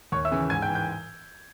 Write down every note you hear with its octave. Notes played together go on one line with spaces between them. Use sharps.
D#2 C#5 C#6
E5 E6
C#3 E3
G#2 G#5 G#6
G5 G6
E3
G5 G6